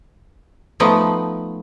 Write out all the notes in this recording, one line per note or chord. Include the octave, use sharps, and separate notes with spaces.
F3 A3 B3 D#4